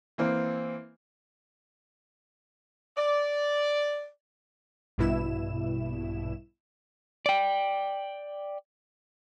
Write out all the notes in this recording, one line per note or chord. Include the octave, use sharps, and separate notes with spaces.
E3 A#3 C4
D5
A#1 G2 B2 E4 E7
D5 G5